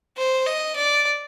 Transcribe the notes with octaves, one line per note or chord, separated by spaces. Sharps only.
C5
D#5
D5